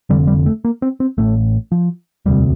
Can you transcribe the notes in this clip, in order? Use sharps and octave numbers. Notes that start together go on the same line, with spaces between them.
F1 F2 D3 G3
G3
A3
A#3
C4
C4
A1 A2 A3
F3
E1 D2 C3 G3